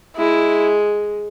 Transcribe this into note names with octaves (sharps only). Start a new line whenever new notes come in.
G#3 E4